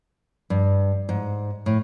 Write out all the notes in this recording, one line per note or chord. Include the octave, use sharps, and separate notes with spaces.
G2
G#2
A2